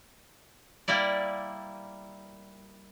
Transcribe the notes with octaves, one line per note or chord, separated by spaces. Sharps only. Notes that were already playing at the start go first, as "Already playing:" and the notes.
G3 A#3 E4 D5